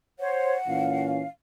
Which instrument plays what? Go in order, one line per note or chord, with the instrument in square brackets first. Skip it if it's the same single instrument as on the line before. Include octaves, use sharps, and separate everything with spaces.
[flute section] C5 C#5 [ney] F#5
[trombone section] A#2 E3 C#4 [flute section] F5